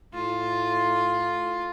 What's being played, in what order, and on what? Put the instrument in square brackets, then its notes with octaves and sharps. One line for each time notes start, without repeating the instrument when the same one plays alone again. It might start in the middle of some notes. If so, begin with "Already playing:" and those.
[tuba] A2 [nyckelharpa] F4